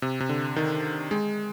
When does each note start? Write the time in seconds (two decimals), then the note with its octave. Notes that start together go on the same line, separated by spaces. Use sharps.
0.02 C3
0.20 C3
0.29 D3
0.56 D#3
1.11 G#3